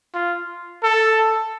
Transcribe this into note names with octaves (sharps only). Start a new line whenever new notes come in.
F4
A4